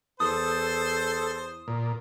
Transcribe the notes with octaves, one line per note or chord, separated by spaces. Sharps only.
E2 A4 C5 D#6
A#2